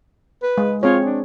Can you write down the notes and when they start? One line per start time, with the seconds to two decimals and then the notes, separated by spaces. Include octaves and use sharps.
0.43 B4
0.58 G#3
0.83 C4 F4 G#4 C#5
1.05 D4